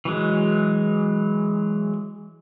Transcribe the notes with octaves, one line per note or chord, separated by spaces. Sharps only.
E3 F#3 G#3